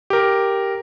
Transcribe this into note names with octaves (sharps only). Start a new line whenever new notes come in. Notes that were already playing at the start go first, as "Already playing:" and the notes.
G4 A#4